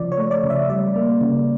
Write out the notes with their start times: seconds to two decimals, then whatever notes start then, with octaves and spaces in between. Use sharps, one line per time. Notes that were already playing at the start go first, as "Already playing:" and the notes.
Already playing: C#3 F3 D5
0.12 C#5
0.18 A3
0.31 D5
0.43 C#3
0.50 E5
0.69 G3 D5
0.96 A#3
1.21 C#3